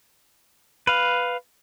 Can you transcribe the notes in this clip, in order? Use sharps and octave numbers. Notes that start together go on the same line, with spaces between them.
B4 F5